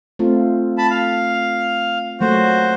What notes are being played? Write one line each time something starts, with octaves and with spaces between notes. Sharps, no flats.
A3 C4 F4
A5 B5
F5
F#3 A3 A#3 F#4 C5